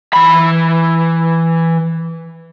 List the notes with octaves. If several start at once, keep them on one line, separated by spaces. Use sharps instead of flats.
E3 B5